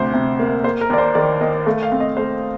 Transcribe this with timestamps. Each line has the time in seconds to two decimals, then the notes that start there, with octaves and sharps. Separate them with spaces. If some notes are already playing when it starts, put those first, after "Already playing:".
Already playing: D2 C3 C5
0.13 C3
0.39 A#3
0.64 A#3 C5
0.81 A#4
0.90 D#2 D5
0.98 C5
1.15 D#3 D5
1.40 A#3 D#5
1.66 A3 F5
1.83 F5
1.92 C4
2.00 D#5
2.17 A3 C5